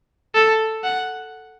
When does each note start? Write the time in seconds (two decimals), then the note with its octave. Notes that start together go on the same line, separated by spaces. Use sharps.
0.35 A4
0.84 F#5